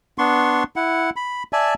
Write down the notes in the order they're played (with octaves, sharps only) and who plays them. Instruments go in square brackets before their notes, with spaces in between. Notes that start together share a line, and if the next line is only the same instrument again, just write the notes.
[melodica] B3 D4 C6 C#6
E4 F#5
B5
D5 E5 G#5 A5